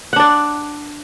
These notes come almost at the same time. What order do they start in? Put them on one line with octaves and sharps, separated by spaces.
F#5 D4 D5